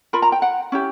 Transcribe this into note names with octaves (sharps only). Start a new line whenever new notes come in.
F4 A#4 B5
A#5
G5
F#5
C#4 E4 G4